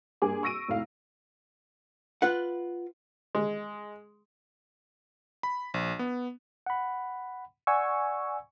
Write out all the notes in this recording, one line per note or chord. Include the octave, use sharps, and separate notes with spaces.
G2 A#3 G#4 G#5 D6
C#6 E6 A#6 D7 D#7
F1 A2 A3 F5
F4 B4 F#5
G#3
B5
A#1
B3
F#5 B5
D5 F#5 G#5 C#6 E6